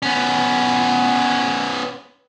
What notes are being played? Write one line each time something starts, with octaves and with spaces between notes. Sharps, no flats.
B3 C#4